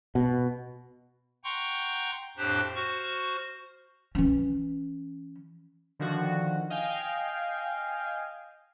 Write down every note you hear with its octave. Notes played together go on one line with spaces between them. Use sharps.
B2
F#5 G5 A#5 C6 C#6 G6
F2 A2 D4 G4 C5 F#6
F#4 C5 C#6 F6
E3 C#4
D3 D#3 F3 F#4
D#5 F5 G5 G#5